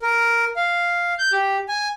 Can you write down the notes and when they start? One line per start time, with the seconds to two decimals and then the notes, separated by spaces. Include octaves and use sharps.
0.02 A#4
0.56 F5
1.19 G6
1.32 G4
1.68 G#5